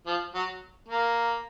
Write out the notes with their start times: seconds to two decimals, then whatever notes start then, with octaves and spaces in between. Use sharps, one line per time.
0.07 F3
0.34 F#3
0.88 A#3